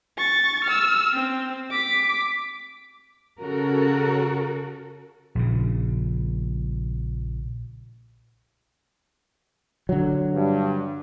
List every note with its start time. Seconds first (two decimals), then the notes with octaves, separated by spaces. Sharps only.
0.18 C#6 A6
0.64 E6 F6
1.13 C4
1.71 D6 B6
3.40 C#3 F#4 A4 A#4
5.35 A#1 C#3
9.89 D3 F#3
10.34 G2